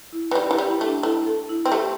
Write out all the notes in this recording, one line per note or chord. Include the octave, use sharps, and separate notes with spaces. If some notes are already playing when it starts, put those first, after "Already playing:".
E4
E3
G3 G4
E3
G4
G3
E4
A3
D4
A3 E4
A4
E4
C4
A3 G4